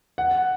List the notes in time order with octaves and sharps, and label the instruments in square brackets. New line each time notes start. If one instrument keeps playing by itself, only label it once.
[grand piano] F#5